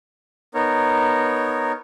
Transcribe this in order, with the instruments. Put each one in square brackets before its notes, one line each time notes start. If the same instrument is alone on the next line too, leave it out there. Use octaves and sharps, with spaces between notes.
[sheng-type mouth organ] B3 D#4 A#4 C#5